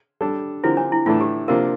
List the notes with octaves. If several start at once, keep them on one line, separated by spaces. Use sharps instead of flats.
G3 D4 A4
D3 F3 C4 E4 G4 A#4
D4
E4
A2 E3 A3 D4 F4 A4
G4
C3 F3 A#3 D4 F4 A#4